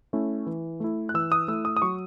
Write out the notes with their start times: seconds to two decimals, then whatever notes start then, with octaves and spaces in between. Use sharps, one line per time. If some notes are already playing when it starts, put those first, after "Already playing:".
0.13 A3 C#4 E4
0.47 E3
0.80 A3 E4
1.09 F#6
1.14 E3 E6
1.32 D#6
1.48 A3 E4 E6
1.65 D#6
1.77 D#6
1.82 F#3 C#6